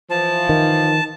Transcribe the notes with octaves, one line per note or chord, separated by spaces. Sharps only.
E3 F3 A5
D#3